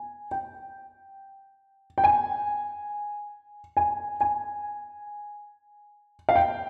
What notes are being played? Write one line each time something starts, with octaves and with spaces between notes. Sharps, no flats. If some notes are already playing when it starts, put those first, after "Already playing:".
Already playing: G#5
G5
G5
G#5
G#5
G#5
F5
G5